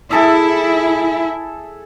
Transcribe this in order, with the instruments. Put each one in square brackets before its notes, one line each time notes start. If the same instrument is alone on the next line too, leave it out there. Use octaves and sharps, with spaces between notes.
[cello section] E4 [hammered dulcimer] G#4 A4 E5